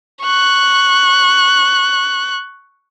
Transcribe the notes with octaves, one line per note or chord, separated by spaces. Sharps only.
C#6 F#6